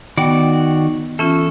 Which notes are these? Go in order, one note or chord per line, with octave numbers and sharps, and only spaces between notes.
D#3 B3 F#4 D5 G5
E3 C#4 F4 A4